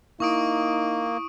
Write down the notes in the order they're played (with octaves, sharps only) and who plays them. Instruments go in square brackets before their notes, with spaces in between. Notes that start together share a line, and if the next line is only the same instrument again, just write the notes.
[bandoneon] A#3 [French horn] D#4 [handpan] E4 [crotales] C#6 D#6 D7